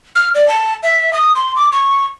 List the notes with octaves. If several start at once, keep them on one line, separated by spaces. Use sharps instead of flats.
F6
D5
A5
E5
D#6
C6
D6
C#6